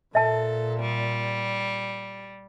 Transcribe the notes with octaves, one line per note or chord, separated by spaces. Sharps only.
A#2 A4 E5 A5
G3